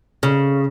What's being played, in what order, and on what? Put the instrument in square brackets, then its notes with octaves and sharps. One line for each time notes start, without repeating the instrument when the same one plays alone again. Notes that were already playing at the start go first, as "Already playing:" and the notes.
[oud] C#3